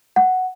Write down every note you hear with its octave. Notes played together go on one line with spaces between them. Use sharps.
F#5